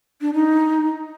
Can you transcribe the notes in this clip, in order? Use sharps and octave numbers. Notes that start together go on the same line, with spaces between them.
D4
D#4